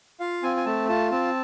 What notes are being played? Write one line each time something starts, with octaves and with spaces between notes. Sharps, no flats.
F4 F5
C4 G#5
G#5
A3 A5
F4 A5
C4 A5